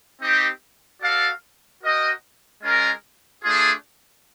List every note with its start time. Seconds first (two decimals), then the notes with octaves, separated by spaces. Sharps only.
0.21 C4 D#4 G4
1.01 F#4 A4 D5 F5
1.82 F#4 A#4 D#5 G5
2.62 G#3 C#4 F4 A#4
3.43 A3 D4 F4 G#4